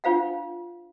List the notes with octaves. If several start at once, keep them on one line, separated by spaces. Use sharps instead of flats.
D4 F4 C5 F5 F#5